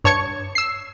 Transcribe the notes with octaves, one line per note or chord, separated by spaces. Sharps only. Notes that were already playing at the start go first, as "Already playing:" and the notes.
G2 C#5 A5 C#6 G#6 C#7
E6 C7